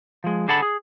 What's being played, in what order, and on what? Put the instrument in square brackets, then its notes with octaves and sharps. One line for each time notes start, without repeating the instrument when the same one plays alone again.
[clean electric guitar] F3 G#3
D3 G#4 A4 F#5 A5 B5
G#4